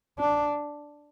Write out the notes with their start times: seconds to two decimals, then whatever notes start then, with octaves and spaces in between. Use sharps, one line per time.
0.19 D4